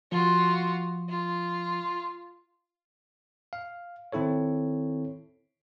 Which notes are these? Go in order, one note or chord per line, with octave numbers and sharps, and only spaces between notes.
F3 F4 F#4
F4
F5
D#3 C4 E4 A4 C#5